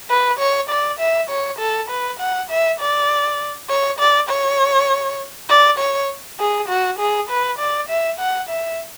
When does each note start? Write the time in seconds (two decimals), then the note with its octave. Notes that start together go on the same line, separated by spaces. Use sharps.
0.10 B4
0.39 C#5
0.70 D5
0.99 E5
1.30 C#5
1.59 A4
1.89 B4
2.20 F#5
2.50 E5
2.80 D5
3.70 C#5
3.99 D5
4.29 C#5
5.49 D5
5.79 C#5
6.40 G#4
6.69 F#4
6.99 G#4
7.30 B4
7.59 D5
7.89 E5
8.20 F#5
8.49 E5